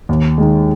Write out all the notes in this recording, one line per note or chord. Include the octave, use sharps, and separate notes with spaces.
D#2
D#3 G#3